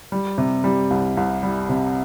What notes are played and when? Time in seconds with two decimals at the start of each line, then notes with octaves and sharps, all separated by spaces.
0.12 G3
0.38 C3
0.64 G3
0.90 C2
1.17 C2
1.43 G3
1.69 C3